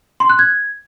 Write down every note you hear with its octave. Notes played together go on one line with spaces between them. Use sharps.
C6
F#6
G#6